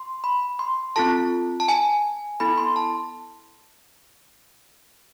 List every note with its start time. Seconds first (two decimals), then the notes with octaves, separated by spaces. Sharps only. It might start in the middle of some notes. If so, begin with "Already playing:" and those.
Already playing: C6
0.24 B5
0.59 C6
0.96 C4 F4 A4 A5
1.60 A5
1.68 G#5
2.40 B3 E4 A4 B5
2.58 C6
2.76 A5